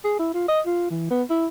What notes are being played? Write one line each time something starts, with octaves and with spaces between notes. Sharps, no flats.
G#4
E4
F4
D#5
F4
E3
B3
E4